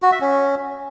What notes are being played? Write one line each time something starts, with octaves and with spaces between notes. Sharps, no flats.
F#4
E5
C#4